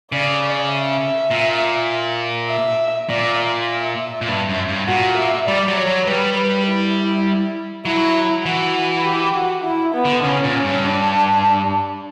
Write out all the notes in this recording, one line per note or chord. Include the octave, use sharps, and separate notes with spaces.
C#3 D5
E5
A#2
E5
A#2 D5
E5
A#2
G2
F#2
G2
A#2 F#4
E5
G3 D5
F#3
C#5
F#3
G3 B4
B4
E4
F#3 E4
E3 F#4
G4
F#4
E4
B3
D3
C#3 C#4
A#2
C#4
G2
D4